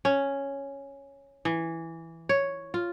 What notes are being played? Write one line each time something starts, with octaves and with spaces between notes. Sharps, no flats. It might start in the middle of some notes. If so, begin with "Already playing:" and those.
C#4
E3
C#5
F4